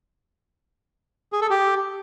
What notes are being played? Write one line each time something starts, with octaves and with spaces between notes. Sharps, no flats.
G#4
A4
G4